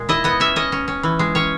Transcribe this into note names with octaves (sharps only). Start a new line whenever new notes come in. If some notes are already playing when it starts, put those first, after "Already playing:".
Already playing: A#2 G#3
E4 D#5
B3 D#5
C#4 E5
C#4 D#5
C#4
C#4
E3
G#3
C#4 C#5